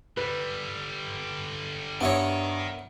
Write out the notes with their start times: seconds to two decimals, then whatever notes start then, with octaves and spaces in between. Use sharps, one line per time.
0.17 D3 G3 B4
2.01 G2 B3 E4 A#4 C#5 D#5